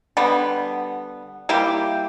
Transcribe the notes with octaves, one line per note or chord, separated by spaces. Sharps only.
D3 G3 B3
G3 A#3 E4 G4